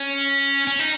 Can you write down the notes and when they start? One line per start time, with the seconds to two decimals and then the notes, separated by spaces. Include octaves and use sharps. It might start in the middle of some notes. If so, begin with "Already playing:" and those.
Already playing: C#4
0.67 C#4
0.79 D#4